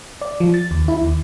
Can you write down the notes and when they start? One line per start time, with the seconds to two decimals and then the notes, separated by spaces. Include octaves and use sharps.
0.21 D5
0.40 F3
0.54 A6
0.71 D#2
0.88 E4
1.02 D#2